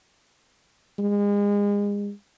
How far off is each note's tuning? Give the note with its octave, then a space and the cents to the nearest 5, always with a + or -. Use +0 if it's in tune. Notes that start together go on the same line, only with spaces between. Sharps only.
G#3 -35